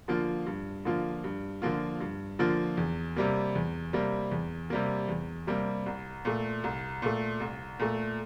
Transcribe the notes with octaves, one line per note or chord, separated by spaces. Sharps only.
D3 F3 A#3 F4
G2
D3 F3 A#3 F4
G2
D3 F3 A#3 F4
G2
D3 F3 A#3 F4
E2
C3 G3 A#3
E2
C3 G3 A#3
E2
C3 G3 A#3
E2
C3 G3 A#3
C2
A#2 A3
C2
A#2 A3
C2
A#2 A3